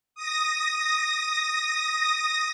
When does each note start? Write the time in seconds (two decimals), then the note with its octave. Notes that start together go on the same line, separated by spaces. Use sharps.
0.15 D#6 A#6